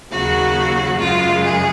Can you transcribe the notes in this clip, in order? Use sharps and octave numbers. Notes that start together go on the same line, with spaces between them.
D#2 C#3 F#3 F#4
F#2 C#3 G#3 F4
G#4